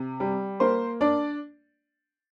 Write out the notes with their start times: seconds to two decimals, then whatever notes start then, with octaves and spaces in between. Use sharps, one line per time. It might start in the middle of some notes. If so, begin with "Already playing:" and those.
Already playing: C3
0.20 G3
0.60 A#3 C5
1.01 D4 D5